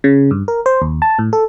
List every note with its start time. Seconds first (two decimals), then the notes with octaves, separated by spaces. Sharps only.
0.04 C#3
0.31 G2
0.48 A#4
0.66 C5
0.82 D#2
1.02 A5
1.19 A2
1.33 A4